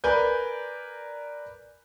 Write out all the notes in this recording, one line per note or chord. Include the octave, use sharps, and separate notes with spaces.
A#4 B4 D5 G#5 G6